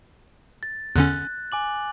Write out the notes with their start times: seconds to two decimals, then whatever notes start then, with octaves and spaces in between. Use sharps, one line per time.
0.63 A6
0.96 E2 D3 C#4 F#6
1.52 G#5 D6 F#7